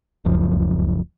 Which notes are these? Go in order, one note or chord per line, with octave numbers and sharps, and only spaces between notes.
D1 C#2 F#2 F3